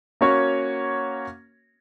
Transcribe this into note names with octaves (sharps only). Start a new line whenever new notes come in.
A#3 C#4 F#4 C#5